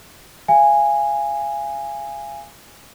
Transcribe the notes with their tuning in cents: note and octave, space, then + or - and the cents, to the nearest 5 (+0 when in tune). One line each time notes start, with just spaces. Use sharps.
F5 -30 G#5 -10